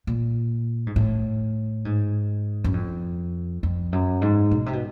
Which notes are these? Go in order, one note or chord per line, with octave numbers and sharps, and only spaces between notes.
A#2
G#2
A2
G#2
F#2
F2
F2
F#2
G#2
B2
C3
B2